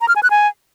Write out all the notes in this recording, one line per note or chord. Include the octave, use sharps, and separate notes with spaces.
A#5
F6
G#5
F#6
G#5